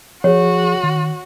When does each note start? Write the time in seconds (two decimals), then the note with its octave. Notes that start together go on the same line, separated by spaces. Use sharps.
0.24 F3 F#4 G#4 C#5
0.83 D#3